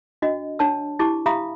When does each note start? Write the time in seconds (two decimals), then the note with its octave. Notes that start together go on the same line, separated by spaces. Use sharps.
0.22 D4 F#4 D#5
0.59 D4 C#5 A5 E6
0.99 E4 G4 A5 D6
1.26 G4 E5 F5 A#5 B5 D#6